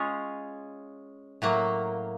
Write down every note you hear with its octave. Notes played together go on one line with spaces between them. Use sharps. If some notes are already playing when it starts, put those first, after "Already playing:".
Already playing: G#3 C#4 F4 G#4
A2 F#3 A#3